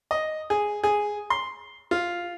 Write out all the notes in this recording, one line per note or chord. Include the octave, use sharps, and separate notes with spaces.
D#5
G#4
G#4
C6
F4